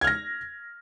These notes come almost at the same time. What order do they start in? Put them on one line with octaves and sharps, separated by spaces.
G#6 F6 A#6